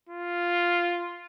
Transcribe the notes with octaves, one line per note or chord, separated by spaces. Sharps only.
F4